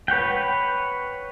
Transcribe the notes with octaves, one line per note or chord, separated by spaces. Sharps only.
B4 C#5 F#5 G5